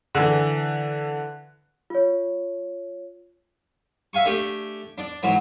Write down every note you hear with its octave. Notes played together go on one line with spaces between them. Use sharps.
D3 E3
F4 C#5
E5 F5 G#5 C#6
A3 D4 G4 G#5
D4 D5
G#2 E3 F#3